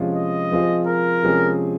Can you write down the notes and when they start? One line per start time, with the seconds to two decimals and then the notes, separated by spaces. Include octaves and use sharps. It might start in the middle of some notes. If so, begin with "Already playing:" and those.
Already playing: C3 F3 G#3 C#4 F4
0.15 D#5
0.51 F3 C4 F4 G#4 C5
0.87 A#4
1.22 C3 F3 G#3 C#4 G#4